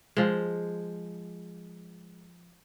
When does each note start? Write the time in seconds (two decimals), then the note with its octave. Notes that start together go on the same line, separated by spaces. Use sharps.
0.17 F3 G#3